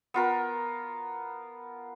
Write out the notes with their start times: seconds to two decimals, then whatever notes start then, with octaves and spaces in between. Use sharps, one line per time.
0.14 B3 F4 A#4